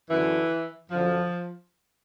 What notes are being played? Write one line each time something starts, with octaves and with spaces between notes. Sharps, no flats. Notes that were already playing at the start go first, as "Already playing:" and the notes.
F#2 D3 E3
F#2 D3 F3